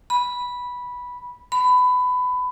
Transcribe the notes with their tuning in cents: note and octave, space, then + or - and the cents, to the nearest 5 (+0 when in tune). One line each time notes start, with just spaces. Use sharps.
B5 -10
B5 +20